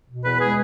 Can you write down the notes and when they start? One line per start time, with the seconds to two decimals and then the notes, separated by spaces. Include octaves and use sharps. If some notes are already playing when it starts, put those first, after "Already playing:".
0.09 B2
0.25 E2 B4
0.40 G#3 G#4